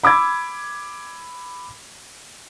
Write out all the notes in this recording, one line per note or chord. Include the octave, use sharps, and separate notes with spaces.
B5 D6 E6 G#6